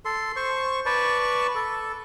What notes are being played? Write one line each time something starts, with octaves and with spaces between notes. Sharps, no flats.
A4 C6
C5 C#6
B4 D5 A5 C#6
A4